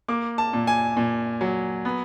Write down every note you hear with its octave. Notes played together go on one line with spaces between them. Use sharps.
A#3 D6
A5
A#2
G#5
A#2
F#3
B3